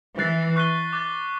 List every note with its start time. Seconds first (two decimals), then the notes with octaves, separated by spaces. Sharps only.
0.19 E3 F#6 A6 C7
0.56 C#6 F#6 B6 D#7 G7
0.93 D6 F#6 A6